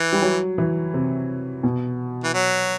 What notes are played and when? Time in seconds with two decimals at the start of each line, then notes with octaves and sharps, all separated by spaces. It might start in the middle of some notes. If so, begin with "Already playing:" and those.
Already playing: E3
0.13 G3
0.22 F#3
0.58 E3
0.94 C3
1.63 B2
2.24 E3
2.34 F#3